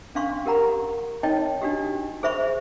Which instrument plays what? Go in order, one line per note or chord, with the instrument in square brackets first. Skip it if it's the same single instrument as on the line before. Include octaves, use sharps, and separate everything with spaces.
[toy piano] C#4 D4 F5 C6 C#6
G4 A#4 F#5 A#5 B5
D#4 C#5 D#5 G5 A5
D4 F#4 G4
G#4 C5 E5 B5 C#6